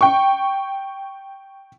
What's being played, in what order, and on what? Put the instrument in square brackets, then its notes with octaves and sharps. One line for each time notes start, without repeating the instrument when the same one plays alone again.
[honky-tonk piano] G5 C#6